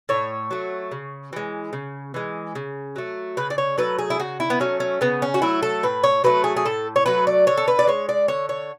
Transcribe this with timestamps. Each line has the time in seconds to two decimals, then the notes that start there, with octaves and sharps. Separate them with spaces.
0.09 A2 C#5
0.51 F#3 A3
0.92 C#3
1.33 E3 G#3
1.73 C#3
2.14 E3 G#3
2.55 C#3
2.96 F#3 A3
3.37 C#3 B4
3.50 D5
3.58 C#5
3.77 F#3 A3 B4
3.99 G#4
4.10 E4
4.19 C#3 F#4
4.40 E4
4.50 B3
4.60 F#3 A3 C#4
4.80 C#4
5.01 C#3 B3
5.22 C#4
5.34 F#4
5.42 F#3 A3 E4
5.63 A4
5.83 A2 B4
6.04 C#5
6.24 F#3 A3 B4
6.44 G#4
6.57 G#4
6.65 A2 A4
6.96 C#5
7.06 F#3 A3 B4
7.27 D5
7.47 D3 C#5
7.58 A4
7.68 B4
7.79 D5
7.87 G#3 C#5
8.09 D5
8.28 D3 C#5
8.49 C#5